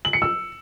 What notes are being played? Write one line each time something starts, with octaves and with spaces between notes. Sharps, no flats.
F#7
C#7
E6